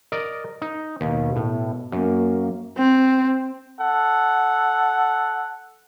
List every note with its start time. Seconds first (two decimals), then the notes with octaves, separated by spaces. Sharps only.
0.12 A#4 D5 D#5
0.62 D#4
1.01 D#2 B2
1.36 A2
1.92 F#2 A#3
2.77 C4
3.79 A4 F#5